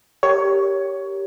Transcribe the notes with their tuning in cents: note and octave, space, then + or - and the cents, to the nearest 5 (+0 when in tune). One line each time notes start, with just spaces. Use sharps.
G4 +0 A#4 +0 C#5 +15